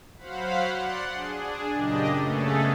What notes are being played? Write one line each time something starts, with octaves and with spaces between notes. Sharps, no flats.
F#3 C5 F5 F#5 B5
D5 F#5 C6
D4 G#4
F#2 A#2 C#3 D4 G4 D#5
C#3 A3 B3 C#4 G#4 A4